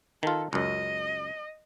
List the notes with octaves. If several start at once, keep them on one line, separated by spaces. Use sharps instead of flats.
D#3 F4 A4
C#2 F#2 D#5